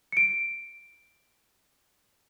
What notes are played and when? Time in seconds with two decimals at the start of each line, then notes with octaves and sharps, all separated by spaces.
0.12 C#7 D7